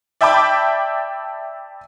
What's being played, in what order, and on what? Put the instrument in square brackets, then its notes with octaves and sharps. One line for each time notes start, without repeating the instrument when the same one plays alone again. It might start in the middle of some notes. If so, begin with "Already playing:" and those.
[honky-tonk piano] D5 E5 G5 A5 B5 D6